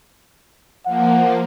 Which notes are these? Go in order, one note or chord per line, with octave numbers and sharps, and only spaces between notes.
F3 A#3 F#5